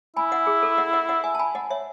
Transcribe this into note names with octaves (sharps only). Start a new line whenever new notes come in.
E4 G#5 B5
D#5 F#5
G#4
A4
D#5 F#5
D#5 F#5
D#5 F#5
E5 G#5
A5
G#5 B5
D#5 F#5
C#5 E5